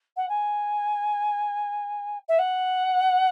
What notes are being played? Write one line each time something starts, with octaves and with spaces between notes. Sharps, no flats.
F#5
G#5
E5
F#5